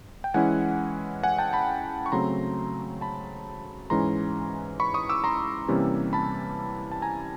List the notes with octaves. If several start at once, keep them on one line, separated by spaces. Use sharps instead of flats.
G5
E3 G#3 C#4 E4 F#5 G#5
F#5 G#5
G5 A5
A5 B5
C#6
C#3 F#3 A3 C4 A#5 C6
A5 B5
G#2 E3 G#3 C#4 A#5 C6
B5 C#6
C#6 D#6
D6 E6
A#5 C6
C3 E3 G3 A#3 C#4
A5 B5
A5
G#5 A#5